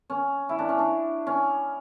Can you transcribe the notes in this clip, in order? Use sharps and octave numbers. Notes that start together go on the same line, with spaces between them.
C#4
E4
D4
C#4
D4
C#4